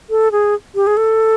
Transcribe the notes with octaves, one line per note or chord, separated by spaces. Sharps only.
A4
G#4
G4
G#4
A4